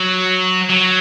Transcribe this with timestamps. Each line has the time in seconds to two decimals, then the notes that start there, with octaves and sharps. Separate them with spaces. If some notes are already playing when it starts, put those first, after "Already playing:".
Already playing: F#3
0.70 F#3